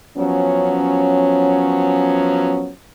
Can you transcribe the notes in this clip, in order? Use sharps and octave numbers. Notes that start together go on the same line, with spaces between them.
F3 F#3 B3 C#4